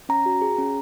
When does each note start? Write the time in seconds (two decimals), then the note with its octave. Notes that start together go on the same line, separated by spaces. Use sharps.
0.09 C#4 A#5
0.26 F#4
0.42 G#4
0.58 C#4